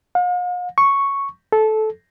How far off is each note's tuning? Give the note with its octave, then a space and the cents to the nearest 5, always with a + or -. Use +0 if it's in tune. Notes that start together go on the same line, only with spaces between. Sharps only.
F5 +45
C#6 +0
A4 -15